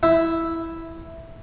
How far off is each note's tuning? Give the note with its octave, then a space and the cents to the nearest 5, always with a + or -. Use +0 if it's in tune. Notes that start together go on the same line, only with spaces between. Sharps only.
E4 +0 E5 +0